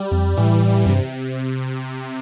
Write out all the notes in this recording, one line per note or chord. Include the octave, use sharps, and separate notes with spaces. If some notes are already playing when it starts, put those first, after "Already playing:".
Already playing: G3
F2
A2 E3
F2
G2 C3